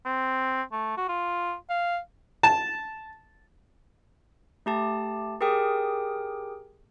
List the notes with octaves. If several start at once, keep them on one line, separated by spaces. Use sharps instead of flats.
C4
A3
F#4
F4
F5
A5
A3 G4 A5
G4 G#4 A#4 G5 D#6